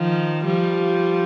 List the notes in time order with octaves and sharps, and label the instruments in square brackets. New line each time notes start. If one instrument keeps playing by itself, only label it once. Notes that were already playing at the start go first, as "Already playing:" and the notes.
Already playing: [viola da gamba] D#3 F3
F3 G3